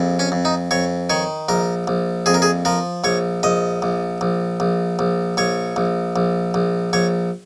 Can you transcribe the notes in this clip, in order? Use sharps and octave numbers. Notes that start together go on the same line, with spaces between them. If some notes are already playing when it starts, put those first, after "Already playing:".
Already playing: A#1 F2
C#4
F2
D#4
F2 C#5
D#3 C#5
A#1 A#4
A#1
F2 G#4
A#4
G#4
F3 A#4
A#1 C#5
A#1 D#5
A#1
A#1
A#1
A#1
A#1 C#5
A#1
A#1
A#1
A#1 C#5